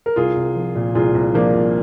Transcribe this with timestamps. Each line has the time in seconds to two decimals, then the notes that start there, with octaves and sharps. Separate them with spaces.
0.06 A#4
0.16 C2 F4 G#4
0.36 C2
0.56 F3
0.75 A#2
0.95 C2 F4 G#4
1.15 C2
1.34 F3 A#3 D4
1.54 A#2